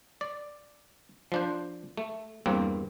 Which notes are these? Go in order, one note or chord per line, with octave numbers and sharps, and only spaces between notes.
D5
F3 D4 C5
A3
E2 G2 A#3 C4